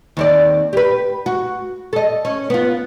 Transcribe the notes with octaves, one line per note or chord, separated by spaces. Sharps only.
D#2 C4 D5
G4 B4
F#4
A4 D#5
C#4
B3 F4